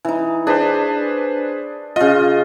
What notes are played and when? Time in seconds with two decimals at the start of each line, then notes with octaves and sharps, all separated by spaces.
0.05 E3 D#4
0.47 D4 G#4 B4 C5
1.96 C#3 F4 D#5